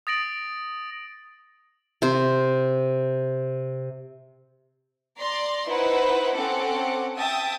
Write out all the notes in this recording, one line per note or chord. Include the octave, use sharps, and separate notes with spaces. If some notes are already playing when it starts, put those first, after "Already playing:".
D#6 A6 A#6 D7 F#7
C3 C5
D5 A#5 C6
D#4 E4 B4 C5 F#5 B5
C4 C#4 A4 F#5 D6
E5 G5 A5 D#6